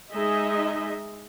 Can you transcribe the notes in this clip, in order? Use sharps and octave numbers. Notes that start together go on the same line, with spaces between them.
G#3 D#4 G#4 D#5 E5